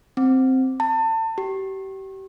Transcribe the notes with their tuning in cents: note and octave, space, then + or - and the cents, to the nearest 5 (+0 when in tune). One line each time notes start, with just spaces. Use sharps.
C4 +0
A5 +30
G4 -30